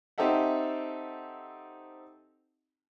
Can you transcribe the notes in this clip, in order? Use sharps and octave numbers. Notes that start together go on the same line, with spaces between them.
C4 D#4 G4 A4 E5 F#5